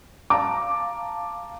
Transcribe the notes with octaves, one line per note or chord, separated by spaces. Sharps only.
F5 A5 A#5 D6